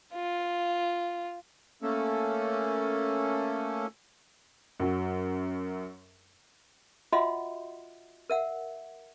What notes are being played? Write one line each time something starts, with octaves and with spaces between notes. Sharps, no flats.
F4
A3 A#3 C#4 A4
F#2 F#3
F4 F#4 D#5 E5 F#5 C6
A#4 E5 F#5